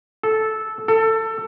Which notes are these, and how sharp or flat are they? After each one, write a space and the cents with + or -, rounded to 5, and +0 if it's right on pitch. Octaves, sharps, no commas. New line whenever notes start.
A4 -10
A4 +20